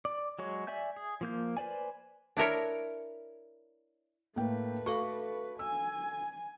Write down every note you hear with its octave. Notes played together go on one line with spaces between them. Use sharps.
D5
F#3 G#3 C#5
D5 E5 G#5 G6
G#4
F3 A#3 G6
B4 C5 D5 G#5
D4 E4 A#4 C#5
A2 A3 A#3 B4 G5
F#4 A4 F5 C#6
G#5 E6